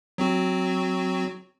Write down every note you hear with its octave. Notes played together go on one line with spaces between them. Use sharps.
F#3 C4 F#4